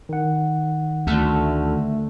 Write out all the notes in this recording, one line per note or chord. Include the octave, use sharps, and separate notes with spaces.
D#3 F#5
D2 D3 A3